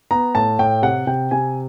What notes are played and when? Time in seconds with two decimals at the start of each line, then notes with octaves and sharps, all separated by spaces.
0.11 B3 A#5
0.35 A2 A5
0.59 A2 G5
0.82 C3 F#5
1.07 C3 G5
1.31 C3 G#5